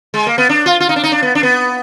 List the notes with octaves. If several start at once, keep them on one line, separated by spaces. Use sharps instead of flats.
G#3
A#3
B3
D4
F4
F4
D#4
D4
D#4
D4
B3
D4
B3